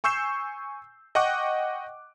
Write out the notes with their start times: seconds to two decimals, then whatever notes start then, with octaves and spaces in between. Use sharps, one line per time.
0.04 G#5 C#6 E6 G6 C7 E7
1.15 D#5 F#5 G5 C#6 D6 F#6